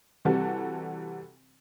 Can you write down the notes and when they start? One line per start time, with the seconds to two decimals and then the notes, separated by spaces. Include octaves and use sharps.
0.25 C3 E3 G3 F#4 G4 A4